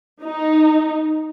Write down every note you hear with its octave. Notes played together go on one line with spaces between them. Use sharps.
D#4